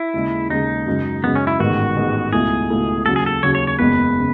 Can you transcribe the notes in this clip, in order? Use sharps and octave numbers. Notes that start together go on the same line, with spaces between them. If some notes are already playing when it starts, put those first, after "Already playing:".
Already playing: E4
D#2 C#3 G#3
D#2 C#3 G#3 D#4
F#2 C#3 G#3
F#2 C#3 G#3 B3
C#4
E4
A1 G#2 D#3 G#3 B3 F#4
A1 G#2 D#3 G#3 B3
C#2 B2 A3 E4 G#4
C#2 B2 A3 E4
D#2 C#3 F#3 A4
G#4
A4
D#2 C#3 F#3 C#5
C#5
C#5
F#1 E2 C#3 G#3 B4
C#3